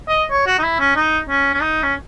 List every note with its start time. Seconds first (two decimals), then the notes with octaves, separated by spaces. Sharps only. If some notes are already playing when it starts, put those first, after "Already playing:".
0.09 D#5
0.31 C#5
0.46 F#4
0.59 D#4
0.63 E4
0.80 C#4
0.96 D#4
1.29 C#4
1.54 C#4
1.61 D#4
1.83 C#4